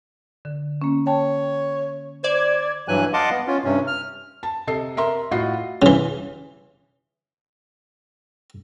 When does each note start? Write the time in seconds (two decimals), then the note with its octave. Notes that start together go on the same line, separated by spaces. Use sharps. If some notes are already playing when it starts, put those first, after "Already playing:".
0.45 D3
0.82 A#3 C#4
1.07 C#5 G5 A5
2.24 C5 D5 G#6
2.88 G2 E3 F#3 G#5 F#6
3.13 D#5 F5 F#5 A5 C6 D6
3.30 B3
3.47 C#4 F4
3.64 G2 C3 C#4
3.87 F6
4.43 A5
4.67 C3 A4 D#5 C7
4.97 A#4 E5 A#5 C6
5.31 A2 F4 F#4 D#5 C7
5.82 C#3 E3